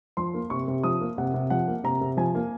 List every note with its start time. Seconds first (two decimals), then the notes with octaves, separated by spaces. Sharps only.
0.17 F3 C6
0.34 A#3
0.50 C3 C#6
0.68 C3
0.83 F3 D#6
1.01 A#3
1.18 C3 F#5
1.34 C3
1.50 F3 F#5
1.68 A#3
1.84 C3 A#5
2.01 C3
2.17 F3 G#5
2.35 A#3